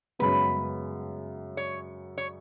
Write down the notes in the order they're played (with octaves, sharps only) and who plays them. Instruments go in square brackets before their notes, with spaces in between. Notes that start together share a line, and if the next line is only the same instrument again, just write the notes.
[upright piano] F#2 C#3 G#3 B3 [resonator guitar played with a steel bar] B4
[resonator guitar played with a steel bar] C#5
C#5